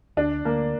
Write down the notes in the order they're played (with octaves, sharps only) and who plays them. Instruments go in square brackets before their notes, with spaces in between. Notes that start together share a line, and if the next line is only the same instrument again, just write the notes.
[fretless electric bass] D2 [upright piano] D4
[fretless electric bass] D2 [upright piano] A#3